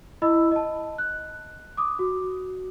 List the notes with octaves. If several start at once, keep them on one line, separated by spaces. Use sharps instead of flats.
E4 D#5 B5 E6
D#5 A5
F#6
D6 D#6
F#4